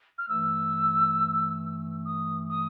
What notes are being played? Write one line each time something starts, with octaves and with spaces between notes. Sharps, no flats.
F6
G2 E3 A3 E6
D#6
D#6